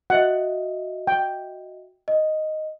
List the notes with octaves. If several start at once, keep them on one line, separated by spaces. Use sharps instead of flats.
F#4 D#5 E5 F#5
G5
D#5